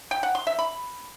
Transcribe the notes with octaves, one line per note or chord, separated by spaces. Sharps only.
G5
F#5
C6
E5
B5